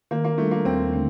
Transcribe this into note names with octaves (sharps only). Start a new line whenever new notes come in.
D#3 A#3
A#3
G3 A3 D4 F4
A#3
D#2 C4
D3 A3 D4